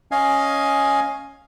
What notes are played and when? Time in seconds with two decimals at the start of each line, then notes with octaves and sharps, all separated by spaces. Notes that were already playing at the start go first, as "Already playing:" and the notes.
0.11 C#4 D#5 F5 G#5